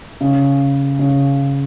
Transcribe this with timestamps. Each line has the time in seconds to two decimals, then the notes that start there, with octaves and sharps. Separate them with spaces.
0.21 C#3
0.99 C#3